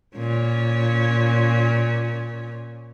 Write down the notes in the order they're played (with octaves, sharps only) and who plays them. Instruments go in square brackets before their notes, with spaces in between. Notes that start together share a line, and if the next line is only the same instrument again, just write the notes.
[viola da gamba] A#2 C#4